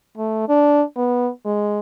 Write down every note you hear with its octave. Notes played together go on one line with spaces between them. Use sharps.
A3
D4
B3
G#3